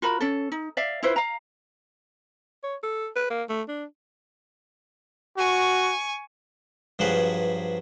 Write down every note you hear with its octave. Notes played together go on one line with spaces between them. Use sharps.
F4 F#4 A#4 B5
C#4 A4
D#4
D5 E5 F5
E4 F4 B4 C5
F5 A#5
C#5
A4
B4
A#3
A3
D4
F#4 G#5 C#6
G2 F3 F#3 G#4 B4